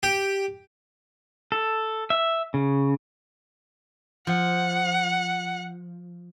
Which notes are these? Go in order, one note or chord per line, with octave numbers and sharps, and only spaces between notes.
G4
A4
E5
C#3
F3 F#5